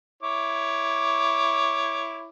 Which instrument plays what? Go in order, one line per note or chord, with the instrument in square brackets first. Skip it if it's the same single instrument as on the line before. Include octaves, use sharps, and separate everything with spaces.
[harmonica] E4 C#5 D6